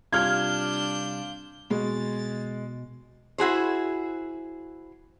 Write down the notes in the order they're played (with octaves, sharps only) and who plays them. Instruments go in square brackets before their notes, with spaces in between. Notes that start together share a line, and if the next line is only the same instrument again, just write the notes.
[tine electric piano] C3 G3 [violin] D4 G6 [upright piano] F4 [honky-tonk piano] F6 G#6
[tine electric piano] B2 [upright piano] G#3 [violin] A6
[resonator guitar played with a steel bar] E4 F#4 G#4 C5